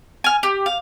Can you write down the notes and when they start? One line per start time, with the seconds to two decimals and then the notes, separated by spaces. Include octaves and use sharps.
0.24 G#5 F6
0.43 G4
0.66 F5